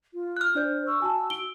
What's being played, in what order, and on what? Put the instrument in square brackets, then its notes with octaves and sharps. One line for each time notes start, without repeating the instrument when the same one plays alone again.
[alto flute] F4
[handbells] F6 F#6
[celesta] D4 D5 G6 [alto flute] C5
[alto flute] C#6 [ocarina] E6
[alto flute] F#4 [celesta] G#5 A5
[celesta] D7 G7